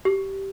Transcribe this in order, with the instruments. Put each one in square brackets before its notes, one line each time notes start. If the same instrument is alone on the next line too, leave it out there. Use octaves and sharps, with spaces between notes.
[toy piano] G4